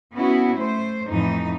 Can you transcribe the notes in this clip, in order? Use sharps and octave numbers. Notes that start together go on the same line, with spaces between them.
B3 C#4 E4 F#4
A3 C5
F2 A2 E3 D#4